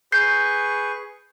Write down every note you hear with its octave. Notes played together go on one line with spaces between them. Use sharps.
G#4 B4 C#6 G6 C7